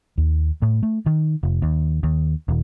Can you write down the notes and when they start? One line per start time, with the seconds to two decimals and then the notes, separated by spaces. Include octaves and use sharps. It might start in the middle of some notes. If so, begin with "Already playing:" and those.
0.18 D#2
0.62 A2
0.83 A3
1.06 D#3
1.43 F1
1.62 D#2
2.03 D#2
2.48 D#1